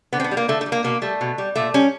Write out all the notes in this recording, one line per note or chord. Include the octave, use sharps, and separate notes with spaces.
D3 B3
C4
B3
G3
A#3
D3 A3
A3
G3
A#3
B2 A#3
G3 A3
B2
G3
A#2 A3
G3 C#4